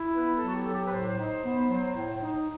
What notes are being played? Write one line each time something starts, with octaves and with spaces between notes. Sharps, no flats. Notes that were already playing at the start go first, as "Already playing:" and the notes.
Already playing: E4
B3 B4
A4
F#3 F#4
G4
F#3 A4
G4
B4
A2 C5
D#4
B3
F#3
A2
D#4